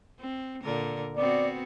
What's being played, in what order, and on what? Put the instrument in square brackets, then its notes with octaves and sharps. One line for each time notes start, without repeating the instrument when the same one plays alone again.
[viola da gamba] C4
A#2 D3 A#4
[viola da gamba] B3 C4 F#4 [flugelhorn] D5